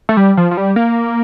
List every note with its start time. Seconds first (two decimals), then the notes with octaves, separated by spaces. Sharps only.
0.09 A3
0.17 G3
0.37 F3
0.51 F3
0.57 G3
0.76 A#3